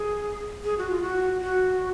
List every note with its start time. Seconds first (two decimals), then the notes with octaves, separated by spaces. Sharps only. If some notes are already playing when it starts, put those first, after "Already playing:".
Already playing: G#4
0.64 G#4
0.78 F#4
0.90 F4
1.02 F#4
1.42 F#4